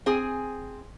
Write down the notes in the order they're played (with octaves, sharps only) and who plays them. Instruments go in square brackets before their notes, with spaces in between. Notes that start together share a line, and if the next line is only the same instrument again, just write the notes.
[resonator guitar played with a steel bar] C4 G#4 G#5